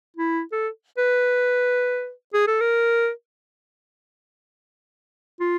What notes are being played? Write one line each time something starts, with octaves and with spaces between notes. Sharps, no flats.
E4
A4
B4
G#4
A4
A#4
F4